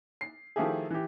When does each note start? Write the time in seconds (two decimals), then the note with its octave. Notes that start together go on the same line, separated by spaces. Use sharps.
0.21 C7
0.56 D#3 F3 A3 E4 G4 G#4
0.91 E3 G4